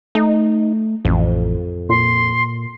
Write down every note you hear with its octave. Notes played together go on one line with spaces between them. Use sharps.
A3 D#4
A1 F2
A#2 C6